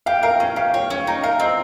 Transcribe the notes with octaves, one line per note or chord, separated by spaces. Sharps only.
G4 F5
G5
A#4 F5
C#4 G5
G4 F5
C#5 G5
C#4 G5
D#4 G5
A#4 F5
C4 D#5